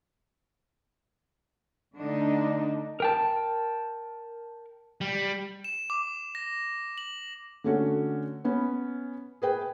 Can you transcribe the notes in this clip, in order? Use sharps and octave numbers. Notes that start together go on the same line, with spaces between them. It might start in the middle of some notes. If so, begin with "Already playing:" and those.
D3 A3 D4 D#4
A#4 G5 A5
G3
E7
D6
A#6
F#7
D3 A3 C#4 F#4
B3 C#4
G#4 B4 G5